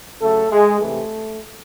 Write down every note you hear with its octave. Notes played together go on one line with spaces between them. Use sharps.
C#3 F#3 A3 A4
G#3 G#4
C3 E3 A3